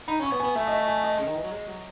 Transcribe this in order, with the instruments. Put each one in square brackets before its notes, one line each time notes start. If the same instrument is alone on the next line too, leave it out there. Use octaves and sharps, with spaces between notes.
[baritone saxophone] D#4 [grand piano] B5
[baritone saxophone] C#4 [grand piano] C#6
[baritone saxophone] B3
[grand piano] G#5
[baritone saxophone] B3
[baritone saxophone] A3 [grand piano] E5
[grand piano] D#5
E5
G#5
D#5
[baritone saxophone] C#3
D#3
E3
F#3
G#3
F#3